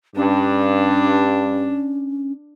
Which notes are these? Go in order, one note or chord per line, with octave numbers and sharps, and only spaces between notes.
G2 C#4 D4